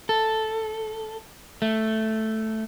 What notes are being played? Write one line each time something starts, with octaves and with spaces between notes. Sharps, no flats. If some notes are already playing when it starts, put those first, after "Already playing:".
A4
A3